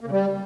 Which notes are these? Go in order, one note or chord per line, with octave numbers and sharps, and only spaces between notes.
A#3
C#3
G3